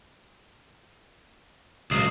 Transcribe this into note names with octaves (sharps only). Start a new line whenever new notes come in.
C#2 F#3 D#6 C7